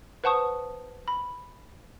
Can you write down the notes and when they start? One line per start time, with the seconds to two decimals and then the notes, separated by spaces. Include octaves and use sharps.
0.24 B4 C5 F#5 A5 C#6 D#6
1.08 B5